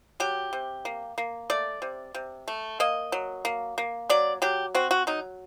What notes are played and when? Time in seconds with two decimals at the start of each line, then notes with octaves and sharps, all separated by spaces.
0.20 F#3 G4
0.53 C3
0.85 A#3
1.18 A#3
1.50 A3 D5
1.82 C3
2.15 C3
2.48 A3
2.80 A#3 D#5
3.12 F#3
3.45 A#3
3.78 A#3
4.10 F#3 D5
4.42 F#3 G4
4.75 C4 F#4
4.91 F#4
5.07 F#3 D#4